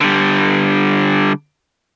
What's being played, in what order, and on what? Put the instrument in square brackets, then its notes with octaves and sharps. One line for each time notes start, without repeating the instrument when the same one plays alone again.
[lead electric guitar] D3 G3